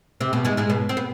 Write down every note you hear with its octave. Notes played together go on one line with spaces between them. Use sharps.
C3 C4
B2 B3
G#2 G#3
G#2 G#3
B2 B3
C4
B3